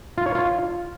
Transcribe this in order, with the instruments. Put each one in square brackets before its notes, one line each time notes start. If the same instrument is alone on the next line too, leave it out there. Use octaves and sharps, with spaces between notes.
[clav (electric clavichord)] F4
C#5
F4